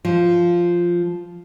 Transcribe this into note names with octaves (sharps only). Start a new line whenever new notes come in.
F3